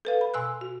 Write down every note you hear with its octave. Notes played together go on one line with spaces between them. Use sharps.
A4 B4 F5
B5
B2 G#5 E6 F#6
F#4